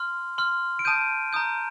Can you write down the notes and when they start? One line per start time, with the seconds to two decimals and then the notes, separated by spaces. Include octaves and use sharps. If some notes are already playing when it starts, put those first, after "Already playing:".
Already playing: C6 F6
0.38 C6 F6
0.79 D7
0.85 A5 D#6 G6 D#7
1.33 A#5 D#6 G6